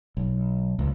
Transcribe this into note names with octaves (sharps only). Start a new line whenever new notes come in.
B1
C#2